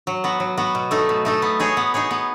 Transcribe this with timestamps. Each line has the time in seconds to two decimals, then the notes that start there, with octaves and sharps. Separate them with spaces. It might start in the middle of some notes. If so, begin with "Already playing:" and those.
0.07 F#3
0.24 B3 F#4
0.40 F#3
0.57 B3 F#4
0.75 B2
0.91 A3 D#4 A4
1.09 B2
1.25 A3 D#4 A4
1.42 B3
1.60 D#4 G#4 C#5
1.77 B3
1.94 D#4 G#4 C#5
2.11 B3